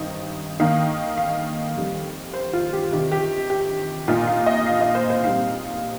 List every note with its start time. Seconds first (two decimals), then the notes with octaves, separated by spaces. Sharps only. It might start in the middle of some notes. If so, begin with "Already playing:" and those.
Already playing: G2 D#3 C4 D#4
0.60 D#3 A#3 D#4 F5
1.17 F5
1.76 F2 D#3 G3
2.34 C5
2.53 F4
2.73 G4
2.91 C3 D#3 C4 G4
3.12 G4
3.50 G4
4.08 A#2 A#3 D#4 F4
4.27 F5
4.46 D#5
4.67 F5
4.81 D#5
4.95 C5
5.10 C5
5.24 A#2 G3 C4 D#4 F5